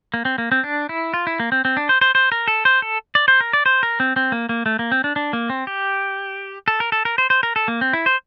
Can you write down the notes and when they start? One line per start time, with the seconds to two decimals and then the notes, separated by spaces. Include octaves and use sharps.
0.14 A#3
0.25 C4
0.38 A#3
0.52 C4
0.64 D4
0.89 E4
1.14 F4
1.27 E4
1.40 A#3
1.52 C4
1.65 C4
1.77 D4
1.89 C5
2.01 C5
2.15 C5
2.32 A#4
2.48 A4
2.65 C5
2.82 A4
3.15 D5
3.28 C5
3.40 A#4
3.53 D5
3.66 C5
3.83 A#4
4.00 C4
4.16 C4
4.32 A#3
4.49 A#3
4.66 A3
4.79 A#3
4.92 C4
5.04 D4
5.16 D4
5.33 A#3
5.50 C4
5.67 G4
6.68 A4
6.80 A#4
6.92 A4
7.05 A#4
7.18 C5
7.30 C5
7.43 A#4
7.56 A4
7.68 A#3
7.81 C4
7.93 E4
8.06 C5